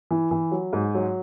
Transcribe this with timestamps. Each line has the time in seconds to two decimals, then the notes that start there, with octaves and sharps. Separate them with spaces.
0.11 E3
0.31 E3
0.52 F#3
0.73 G#2
0.95 F#3